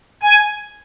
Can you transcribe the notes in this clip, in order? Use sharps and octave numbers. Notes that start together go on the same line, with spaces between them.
G#5